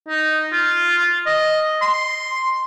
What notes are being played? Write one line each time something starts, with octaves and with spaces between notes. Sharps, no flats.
D#4
F4
D#5
C6